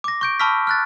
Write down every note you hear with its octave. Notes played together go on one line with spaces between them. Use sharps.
D6 A#6
C#6 G6 D7
A5 B5 C#6 E6 F6 B6
F6 F#6 A6